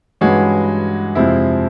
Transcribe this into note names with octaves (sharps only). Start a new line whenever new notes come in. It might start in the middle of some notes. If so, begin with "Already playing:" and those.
G2 E3 G#3 C#4 F#4
F2 C3 F3 G#3 C4 E4